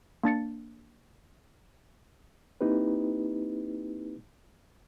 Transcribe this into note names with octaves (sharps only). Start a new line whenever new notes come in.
A#3 D4 A6 C#7
A#3 C4 D#4 E4 G4 B4